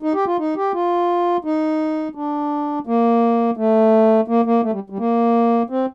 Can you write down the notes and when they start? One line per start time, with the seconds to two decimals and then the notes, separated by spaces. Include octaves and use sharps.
0.02 D#4
0.14 G4
0.26 F4
0.38 D#4
0.56 G4
0.73 F4
1.45 D#4
2.15 D4
2.87 A#3
3.57 A3
4.28 A#3
4.45 A#3
4.63 A3
4.72 G3
4.90 G3
4.99 A#3
5.70 C4